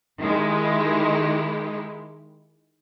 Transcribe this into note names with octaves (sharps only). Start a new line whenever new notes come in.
D#3 G#3 E4 G4